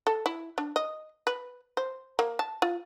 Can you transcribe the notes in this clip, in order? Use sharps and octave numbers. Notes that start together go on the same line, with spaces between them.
A4
E4
D4
D#5
B4
C5
A#3
A5
F4